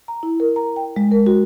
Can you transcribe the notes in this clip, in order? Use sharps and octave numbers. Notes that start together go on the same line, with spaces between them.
A#5
E4
A#4
A#5
G5
G#3
A#4
F#4